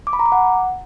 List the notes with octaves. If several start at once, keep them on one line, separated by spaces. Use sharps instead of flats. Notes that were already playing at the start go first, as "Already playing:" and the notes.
D6
B5
A#5
D6
F#5